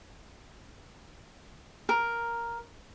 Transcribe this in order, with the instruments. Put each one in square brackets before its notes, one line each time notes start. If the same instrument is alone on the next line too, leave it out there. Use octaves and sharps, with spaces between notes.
[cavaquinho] A#4